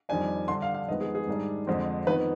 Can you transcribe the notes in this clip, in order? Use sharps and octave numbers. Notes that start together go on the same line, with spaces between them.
F2 D#3 G3 D4 G#5
D3 G3 D4 C6
F5
F5
F2 D#3 G#3 B3 D#5
G#4
G#4
G#2 D#3 G3 D4
F2 D3 G#3 C4
F2 D#3 B3 B4